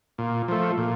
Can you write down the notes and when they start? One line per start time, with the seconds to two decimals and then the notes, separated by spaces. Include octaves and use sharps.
0.18 A#2
0.48 F3 A3
0.78 A#2